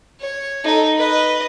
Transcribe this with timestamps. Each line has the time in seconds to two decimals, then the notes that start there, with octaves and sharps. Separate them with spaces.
0.20 C#5
0.64 D#4 A4
0.95 B4 D#5